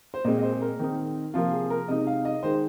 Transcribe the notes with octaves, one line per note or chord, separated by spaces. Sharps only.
C5
A#2 G#3 C4 D#5
D#5
C5
G#4
A#4
D#3 C4 D#4
C3 F3 A#3 F4
G#4
A#4
C3 G#3 D#4 D#5
F5
D#5
D#3 G#3 D#4 C5